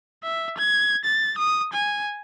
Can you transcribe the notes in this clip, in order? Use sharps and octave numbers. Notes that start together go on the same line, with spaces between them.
E5
G#6
A6
D#6
G#5